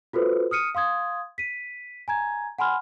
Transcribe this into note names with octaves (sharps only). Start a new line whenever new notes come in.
F4 F#4 A4 B4 C5
D#6 F6 C#7 D#7
F5 C6 D#6 G#6
B6 D#7
G#5 A#5 G#6
F#5 G#5 B5 C6 F6